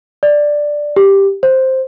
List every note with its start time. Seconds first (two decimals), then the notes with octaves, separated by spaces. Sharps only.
0.23 D5
0.96 G4
1.43 C5